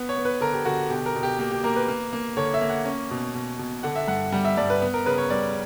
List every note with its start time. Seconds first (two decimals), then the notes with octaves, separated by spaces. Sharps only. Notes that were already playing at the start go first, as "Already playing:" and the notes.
Already playing: B3
0.09 C#5
0.16 B3
0.25 B4
0.41 D3 A#4
0.53 G4
0.65 D3 F#4
0.90 B2 G4
1.06 A#4
1.15 B2
1.23 G4
1.39 A#3 G4
1.52 G4
1.64 A#3 A#4
1.76 B4
1.88 A#3
2.13 A#3
2.37 D3 C#5
2.54 E5
2.61 A#3
2.69 F#5
2.85 C#4
3.11 B2
3.34 B2
3.59 B2
3.83 D3 F#5
3.96 E5
4.08 G2 F#5
4.32 G3 F#5
4.45 E5
4.57 G2 D5
4.70 B4
4.81 B3
4.94 A#4
5.06 C#3 B4
5.18 C#5
5.30 G3 D5